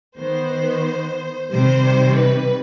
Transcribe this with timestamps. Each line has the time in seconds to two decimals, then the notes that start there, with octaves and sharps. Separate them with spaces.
0.18 D#3 B3 C5
1.51 C3 D#3 G3 C5
2.17 B4